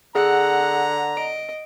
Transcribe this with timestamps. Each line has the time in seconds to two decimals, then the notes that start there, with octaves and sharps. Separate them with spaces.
0.15 D3 G#4 F#5 A#5 E6
1.17 D#5 D7